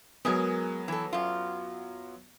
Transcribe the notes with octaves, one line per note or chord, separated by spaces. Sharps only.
F#3 G#3 B3 G#4 A#4
E3 A4
F#2 F4